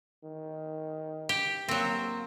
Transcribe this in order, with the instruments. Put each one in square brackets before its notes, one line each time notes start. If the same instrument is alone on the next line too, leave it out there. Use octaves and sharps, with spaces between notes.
[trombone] D#3
[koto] G4
[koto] F#3 C4 [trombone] A#3